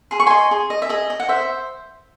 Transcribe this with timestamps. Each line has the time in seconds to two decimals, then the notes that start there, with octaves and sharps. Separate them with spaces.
0.11 G#4 C6
0.20 C#6
0.27 D#5 G#5 C6
0.51 G#4
0.70 D#5
0.82 E5
0.89 G#4 D#5
1.10 D#5
1.20 F#5
1.29 C5 E5